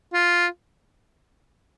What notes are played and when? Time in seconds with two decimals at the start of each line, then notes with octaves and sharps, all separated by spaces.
0.13 F4